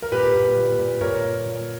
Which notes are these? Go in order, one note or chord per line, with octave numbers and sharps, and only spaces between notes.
A#4
A#2 G4 B4
A#2
A#2
A#2
A#2 A#4 C#5
A#2
A#2